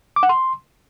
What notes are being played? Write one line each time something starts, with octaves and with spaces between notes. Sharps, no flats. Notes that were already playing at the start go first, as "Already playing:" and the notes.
D6
F#5
C6